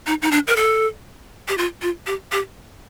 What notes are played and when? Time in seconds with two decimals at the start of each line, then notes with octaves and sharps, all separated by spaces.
0.07 D#4
0.22 D#4
0.31 D4
0.47 A#4
0.56 A4
1.48 G4
1.58 F4
1.82 F4
2.07 G4
2.32 G4